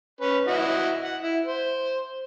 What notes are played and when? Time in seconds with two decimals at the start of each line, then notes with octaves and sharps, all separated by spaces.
0.21 C#4 B4
0.48 E4 F#4 D#5
1.04 F#5
1.23 E4
1.45 C5